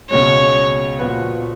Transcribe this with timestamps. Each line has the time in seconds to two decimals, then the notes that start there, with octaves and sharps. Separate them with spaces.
0.10 C#2 B2 G#3 C#5
0.99 A#2 F3 B3 F#4 B4